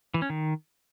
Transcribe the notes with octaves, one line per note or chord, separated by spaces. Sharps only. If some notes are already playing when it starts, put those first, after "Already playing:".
E3
C#4
D#3